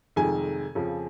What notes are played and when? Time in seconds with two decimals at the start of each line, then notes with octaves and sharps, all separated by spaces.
0.16 F1 F2 D#3 G#3 G#5
0.75 F2 C#3 F3